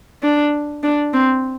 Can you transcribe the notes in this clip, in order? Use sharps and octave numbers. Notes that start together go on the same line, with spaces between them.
D4
D4
C4